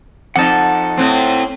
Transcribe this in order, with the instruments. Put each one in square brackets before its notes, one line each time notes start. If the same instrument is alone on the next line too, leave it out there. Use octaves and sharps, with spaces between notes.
[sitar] F2 D#4 [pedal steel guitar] F#5 A5
[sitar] A2 C4